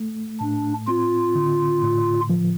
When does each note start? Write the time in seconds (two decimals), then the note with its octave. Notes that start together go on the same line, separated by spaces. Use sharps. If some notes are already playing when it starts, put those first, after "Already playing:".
Already playing: A3
0.40 A2 D4
0.87 C4 F4
1.35 D3
1.83 A2
2.30 F3